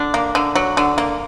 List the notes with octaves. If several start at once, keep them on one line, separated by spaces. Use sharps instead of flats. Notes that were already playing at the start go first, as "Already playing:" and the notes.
Already playing: D3 D4
A#3
D3
F#3
D3
A#3